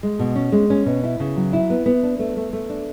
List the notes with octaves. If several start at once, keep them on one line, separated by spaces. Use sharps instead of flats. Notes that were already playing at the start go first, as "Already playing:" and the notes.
G#3
B2
C#4
G#3
C#4
B2
E4
C#3
F#3
E4
B3
B3
D4
A3
A3
A3
D4